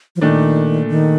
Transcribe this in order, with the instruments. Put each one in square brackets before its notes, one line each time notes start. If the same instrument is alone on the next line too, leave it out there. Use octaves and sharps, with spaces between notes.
[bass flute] F3
[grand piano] A#2 A3 D4 [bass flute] D#3
[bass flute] D#3